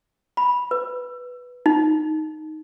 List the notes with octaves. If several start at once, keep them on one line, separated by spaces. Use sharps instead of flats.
B5
B4
D#4